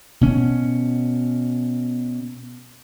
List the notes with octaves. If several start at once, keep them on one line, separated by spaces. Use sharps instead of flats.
B2 C#4